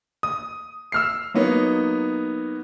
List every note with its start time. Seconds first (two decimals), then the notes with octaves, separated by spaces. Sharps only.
0.23 D#6
0.92 E6 F6 C7
1.34 F#3 A#3 B3 D#4 C#5